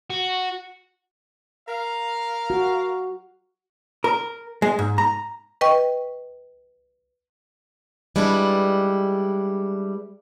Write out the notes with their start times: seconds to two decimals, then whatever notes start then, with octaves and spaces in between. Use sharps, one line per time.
0.10 F#4
1.68 A#4 F5
2.50 F#4
4.04 A#4
4.62 G#3
4.79 G#2
4.98 A#5
5.61 B4 D#5 G5 C#6
8.16 G3 G#3 D4 E4 B4